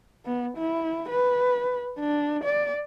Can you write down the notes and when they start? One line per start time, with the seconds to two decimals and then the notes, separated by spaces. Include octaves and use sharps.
0.25 B3
0.57 E4
1.09 B4
1.99 D4
2.44 D5